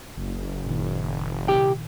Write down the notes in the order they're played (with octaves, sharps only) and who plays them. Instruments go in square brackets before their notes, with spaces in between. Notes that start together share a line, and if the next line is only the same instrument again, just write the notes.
[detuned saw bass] F#1
[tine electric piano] A#2 D#3
[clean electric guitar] C2 G4 G5